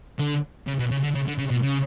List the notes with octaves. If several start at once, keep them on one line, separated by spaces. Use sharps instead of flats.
D3
C#3
B2
C#3
D3
C#3
D3
C#3
B2
C#3